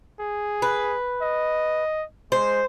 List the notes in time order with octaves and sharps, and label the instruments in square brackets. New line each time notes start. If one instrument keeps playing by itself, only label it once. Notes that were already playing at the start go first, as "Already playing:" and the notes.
[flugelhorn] G#4
[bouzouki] B4
[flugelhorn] D#5
[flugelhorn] G#3 [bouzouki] C5